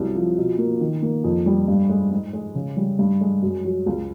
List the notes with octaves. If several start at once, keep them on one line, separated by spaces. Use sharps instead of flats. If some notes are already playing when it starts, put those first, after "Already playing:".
Already playing: C2 F#3
F3
B2
A#3
D#3
A#3
F2
G3
G2
G#3
G#2
G#3
C#3
G3
G2
G#3
F#2
F#3
C#2